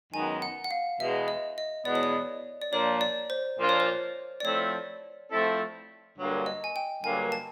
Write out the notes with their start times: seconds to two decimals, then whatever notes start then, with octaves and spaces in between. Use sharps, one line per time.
0.13 F#2 D#3 G#3 B3 G#5
0.42 F#5
0.64 F#5
0.71 F5
1.00 E2 B2 G#3 B3 E5
1.28 D#5
1.58 D#5
1.85 E2 B2 G#3 B3 D5
1.95 C#5
2.03 D5
2.62 D5
2.72 A#2 F3 A#3 D4 F4 C#5
3.01 D5
3.30 C5
3.59 A#2 F3 A#3 D4 F4
3.69 C#5
3.80 C5
4.40 D5
4.44 F3 A3 C4 E4 A4 C#5
5.31 F3 A3 C4 E4 A4
6.18 G2 D3 F#3 A#3
6.46 D#5
6.64 G#5
6.76 G5
7.03 G2 D3 F#3 A#3 G#5
7.32 A5